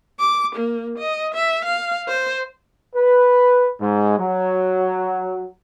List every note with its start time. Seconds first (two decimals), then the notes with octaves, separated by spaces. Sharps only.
0.19 D6
0.56 A#3
0.99 D#5
1.34 E5
1.65 F5
2.08 C5
2.95 B4
3.81 G#2 G#3
4.18 F#3